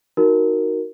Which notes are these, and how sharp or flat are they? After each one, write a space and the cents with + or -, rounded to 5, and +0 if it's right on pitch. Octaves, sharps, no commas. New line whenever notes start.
D#4 +5 F#4 +0 A#4 +0